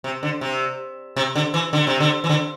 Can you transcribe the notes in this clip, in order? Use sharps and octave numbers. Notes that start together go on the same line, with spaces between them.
C3
D3
C3
C3
D3
E3
D3
C3
D3
E3
D3